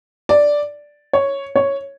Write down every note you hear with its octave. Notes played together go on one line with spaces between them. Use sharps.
D5
C#5
C#5